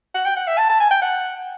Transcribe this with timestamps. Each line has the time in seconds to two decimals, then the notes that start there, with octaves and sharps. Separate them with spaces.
0.15 F#5
0.25 G5
0.36 F#5
0.47 E5
0.58 A5
0.69 A5
0.80 G#5
0.91 G5
1.02 F#5